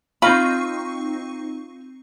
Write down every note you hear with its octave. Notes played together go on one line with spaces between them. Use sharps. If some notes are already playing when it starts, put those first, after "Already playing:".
C4 D#4 F4 B5 C#6